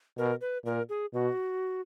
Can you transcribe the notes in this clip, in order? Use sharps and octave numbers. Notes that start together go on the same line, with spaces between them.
B2 A#4
B4
A#2 A#4
G#4
B2 F#4